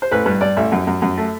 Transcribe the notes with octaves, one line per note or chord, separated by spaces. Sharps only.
C5
A1 B4
G2 B4
G2 D5
A1 E5
F#2
F#2
F#2
A3